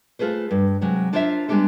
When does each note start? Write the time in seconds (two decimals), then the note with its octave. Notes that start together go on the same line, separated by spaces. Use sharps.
0.19 A3 F4 G#4 B4 C5
0.51 G2
0.81 C3 F#3 G#3
1.13 D4 F4 A#4 C5 C#5 E5
1.48 G3 G#3 B3 D4 G4 A4